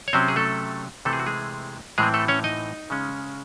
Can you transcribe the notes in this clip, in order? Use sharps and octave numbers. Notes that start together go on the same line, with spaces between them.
C#5
C3 F#3 C4 C#4 C5
G#4
A3 A4
C3 E3 A3 C4 A4
G#4
F#4
G#3 G#4
A2 E3 G#3 C4 G#4
A3 A4
C#4 C#5
D#4 D#5
C#3 G#3 C#4